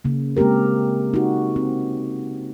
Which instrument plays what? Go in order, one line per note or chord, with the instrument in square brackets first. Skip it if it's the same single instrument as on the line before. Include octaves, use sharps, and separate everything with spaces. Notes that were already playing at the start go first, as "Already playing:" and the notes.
[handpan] C#3 A#3
G#3 A#3 C4 G4 A#4
D#4 F#4
C4